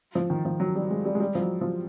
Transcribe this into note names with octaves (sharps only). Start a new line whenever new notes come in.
F3
D#3
F3
F#3
G3
G#3
G3
G#3
G3
F3
F#3
F3